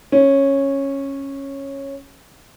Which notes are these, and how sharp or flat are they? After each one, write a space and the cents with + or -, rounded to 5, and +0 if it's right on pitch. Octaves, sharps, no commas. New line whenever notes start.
C#4 -10